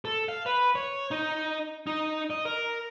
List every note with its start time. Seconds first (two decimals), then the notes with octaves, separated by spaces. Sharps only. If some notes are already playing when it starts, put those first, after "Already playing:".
0.05 A4
0.28 F5
0.46 B4
0.75 C#5
1.11 D#4
1.87 D#4
2.30 D#5
2.45 A#4